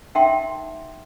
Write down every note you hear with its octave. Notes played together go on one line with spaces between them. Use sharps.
D#4 A#4 E5 F#5 G5 C6